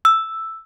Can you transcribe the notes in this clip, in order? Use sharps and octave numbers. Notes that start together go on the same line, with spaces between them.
E6